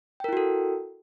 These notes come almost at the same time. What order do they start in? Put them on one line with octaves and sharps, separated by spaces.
G5 A#4 E4 F#4 A4